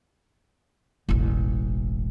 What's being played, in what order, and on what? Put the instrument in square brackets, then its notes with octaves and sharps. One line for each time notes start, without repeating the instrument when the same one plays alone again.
[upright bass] E1 A1